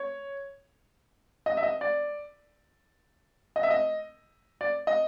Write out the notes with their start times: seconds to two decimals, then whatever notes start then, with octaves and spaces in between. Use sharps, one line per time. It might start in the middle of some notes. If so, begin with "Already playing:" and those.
Already playing: C#5
1.46 D#5
1.57 E5
1.63 D#5
1.81 D5
3.56 D#5
3.63 E5
3.70 D#5
4.61 D5
4.87 D#5